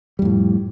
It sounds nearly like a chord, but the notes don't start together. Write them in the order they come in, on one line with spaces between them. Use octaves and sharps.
G3 F2 A2